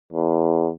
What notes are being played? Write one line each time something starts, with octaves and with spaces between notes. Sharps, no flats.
E2